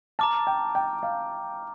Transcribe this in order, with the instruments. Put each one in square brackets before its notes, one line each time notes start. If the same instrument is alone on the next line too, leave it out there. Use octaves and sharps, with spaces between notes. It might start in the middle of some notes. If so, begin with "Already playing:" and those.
[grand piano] A5 [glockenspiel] A#5 D6 F6
[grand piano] G5
G5
F5